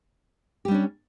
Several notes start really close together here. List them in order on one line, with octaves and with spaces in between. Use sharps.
G4 G3 D4 C#4